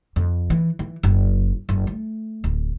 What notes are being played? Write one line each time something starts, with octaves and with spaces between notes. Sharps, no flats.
F2
E3
E3
F#1
F#1
A3
D1